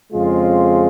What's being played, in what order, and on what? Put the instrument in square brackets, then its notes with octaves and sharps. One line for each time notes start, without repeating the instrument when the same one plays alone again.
[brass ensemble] F2 C#3 G#3 C4 F4